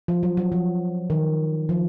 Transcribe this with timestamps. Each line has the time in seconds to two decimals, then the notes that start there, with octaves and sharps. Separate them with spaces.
0.08 F3
0.23 F#3
0.37 F#3
0.52 F3
1.10 D#3
1.69 F3